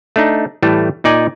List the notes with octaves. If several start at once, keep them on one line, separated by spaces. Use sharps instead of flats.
A3 D4 D#4
A2 E3 G3 A3
A#2 D#4 D5 G#5